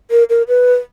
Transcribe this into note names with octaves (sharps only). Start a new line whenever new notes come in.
A#4
A#4
B4